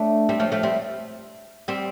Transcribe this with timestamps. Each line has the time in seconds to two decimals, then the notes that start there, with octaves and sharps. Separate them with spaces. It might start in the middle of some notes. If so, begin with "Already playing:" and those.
Already playing: A3 D4
0.29 G3 C4
0.40 F3 A3
0.52 F3 A3
0.63 G3 C4
1.68 G3 C4